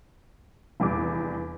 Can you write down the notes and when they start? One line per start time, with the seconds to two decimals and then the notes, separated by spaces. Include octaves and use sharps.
0.80 F1 E2 G3 D6